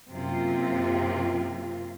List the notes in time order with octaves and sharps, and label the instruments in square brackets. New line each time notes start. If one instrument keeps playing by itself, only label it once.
[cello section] F#2 C3 A#3 F4